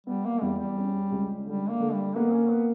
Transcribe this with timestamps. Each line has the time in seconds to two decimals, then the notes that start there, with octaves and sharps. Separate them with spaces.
0.07 G3 B3
0.25 A#3
0.41 E2 G3
0.59 G3
0.77 C#4
1.12 C#2
1.46 D3 G3
1.69 A#3
1.80 D3
1.92 G3
2.16 A#3 B3
2.33 C#4
2.50 B3